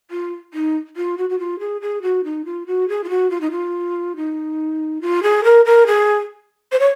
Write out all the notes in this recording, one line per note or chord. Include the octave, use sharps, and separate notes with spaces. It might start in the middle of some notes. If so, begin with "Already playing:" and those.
F4
D#4
F4
F#4
F#4
F4
G#4
G#4
F#4
D#4
F4
F#4
G#4
F4
F#4
F4
D#4
F4
D#4
F4
G#4
A#4
A#4
G#4
C5
C#5